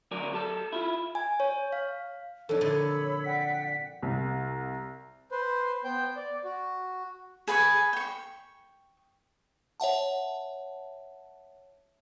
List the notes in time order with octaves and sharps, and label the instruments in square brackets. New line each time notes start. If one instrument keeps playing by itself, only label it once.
[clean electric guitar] D2 F#3 A#4 D5 G#5
G4 A4 A5
E4 F4
[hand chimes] G#5
C#5
F5
[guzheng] F2 E3 [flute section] D4 D#4 C#5 [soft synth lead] A4
[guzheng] A#2 D3 D#5 [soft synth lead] A4 [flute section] C#5 B5 E6
[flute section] D5 F#5 G5 [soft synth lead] B6
[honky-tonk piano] C2
[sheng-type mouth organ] B4 C5
B3 C5 G5 G6
D5
F#4
[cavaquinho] G#4 B4 G#5 C#6
G5 C#6
[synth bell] C#5 E5 F#5 A5